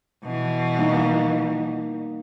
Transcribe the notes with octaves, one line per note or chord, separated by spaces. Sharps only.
B2 E3
G3 A#3 D#4